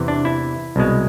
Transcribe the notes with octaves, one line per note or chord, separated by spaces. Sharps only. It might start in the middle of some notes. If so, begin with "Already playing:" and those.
Already playing: E2 C3 E3
D4
E4
C2 B2 G#3